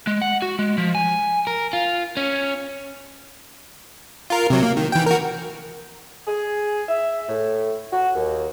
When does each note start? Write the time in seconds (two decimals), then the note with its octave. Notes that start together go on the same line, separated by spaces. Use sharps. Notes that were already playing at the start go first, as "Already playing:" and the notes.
0.07 G#3
0.22 F#5
0.42 F#4
0.59 G#3
0.78 F3
0.95 G#5
1.47 A#4
1.73 F4
2.17 C#4
4.30 F4 A#4
4.50 C3 F#3
4.63 A#3
4.77 D#3
4.92 E3 G5
5.06 F#4 A#4
6.27 G#4
6.89 E5
7.28 A2
7.92 F#4
8.15 D#2